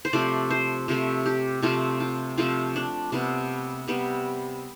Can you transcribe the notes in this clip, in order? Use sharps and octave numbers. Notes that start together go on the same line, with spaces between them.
C5
C3 F3 A3 D5
C5
C3 F3 A3
G4
C3 F3 A3 C4 F4
F4
C3 F3 A3 C4 F4
D4
C3 G3 B3 D4
C3 G3 B3